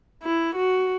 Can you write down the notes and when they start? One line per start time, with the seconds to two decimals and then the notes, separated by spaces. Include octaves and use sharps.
0.23 E4
0.56 F#4